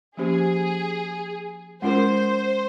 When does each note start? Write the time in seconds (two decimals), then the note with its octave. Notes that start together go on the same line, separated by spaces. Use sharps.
0.17 F3 A#3 C#4 G4 G#4 C5
1.82 G#3 C#4 F4 A#4 C5